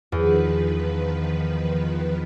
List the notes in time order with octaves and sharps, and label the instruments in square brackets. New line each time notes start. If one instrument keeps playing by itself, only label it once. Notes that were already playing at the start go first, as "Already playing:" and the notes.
[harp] E2 [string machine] D#3 F3 B4